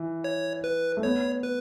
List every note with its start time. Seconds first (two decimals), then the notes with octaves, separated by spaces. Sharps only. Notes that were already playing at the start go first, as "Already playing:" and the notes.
Already playing: E3
0.24 C#5
0.64 B4
0.97 A3
1.03 B3 C#5
1.43 B4